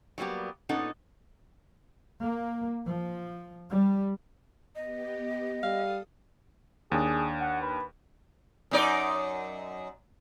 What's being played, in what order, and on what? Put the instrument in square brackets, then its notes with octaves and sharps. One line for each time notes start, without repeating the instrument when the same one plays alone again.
[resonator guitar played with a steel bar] F#3 G3 A#3 B3 G4
A#2 B3 C#4 D#4 A4 F#5
[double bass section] A#3
F3
G3
[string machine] B3 G4 [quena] D#5
[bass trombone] G3 [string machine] A4 D#6 [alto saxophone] F5
[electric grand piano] D#2 D4 [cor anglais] G#4
[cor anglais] F#5
B4
[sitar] F#2 D#4 D5